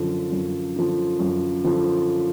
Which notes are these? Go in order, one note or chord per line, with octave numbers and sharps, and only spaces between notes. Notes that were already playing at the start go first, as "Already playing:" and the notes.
Already playing: F#2 D3 F3
F#2
D3 F3
F#2
D3 F3